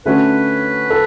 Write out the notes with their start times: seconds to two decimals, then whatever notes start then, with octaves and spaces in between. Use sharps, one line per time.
0.06 D3 A3 C#4 F#4 B4
0.90 A4